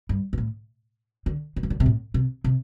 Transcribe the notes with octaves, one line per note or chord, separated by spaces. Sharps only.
G2
G2
A2
D3
D3
F3
D3
C3
A2
C3
C3